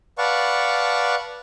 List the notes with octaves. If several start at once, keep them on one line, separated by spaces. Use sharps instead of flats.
B4 D5 F5 F#5 A5 C#6